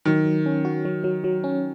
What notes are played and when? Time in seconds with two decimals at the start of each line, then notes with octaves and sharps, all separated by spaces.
0.05 D#3 F#3
0.26 F#3
0.46 C#4
0.65 F#4
0.85 F#3
1.04 F#3
1.24 F#3
1.44 C#4